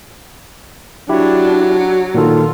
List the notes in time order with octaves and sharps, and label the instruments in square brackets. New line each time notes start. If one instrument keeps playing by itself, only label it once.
[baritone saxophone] F#3 [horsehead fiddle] D4 [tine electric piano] E4 G4
[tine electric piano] A#2 D#3 A4 [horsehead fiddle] F4